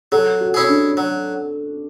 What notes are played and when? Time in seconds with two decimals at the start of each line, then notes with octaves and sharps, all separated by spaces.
0.12 F#3 A4
0.41 F#4
0.54 C#4 E4 G#4
0.69 D4
0.97 F#3